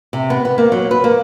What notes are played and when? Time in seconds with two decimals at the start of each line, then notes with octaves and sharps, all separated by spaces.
0.13 C3
0.30 B3
0.45 B3
0.58 A#3
0.72 F#3
0.91 B4
1.04 A#3